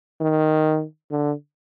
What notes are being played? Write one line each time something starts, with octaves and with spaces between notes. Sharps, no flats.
D#3
D3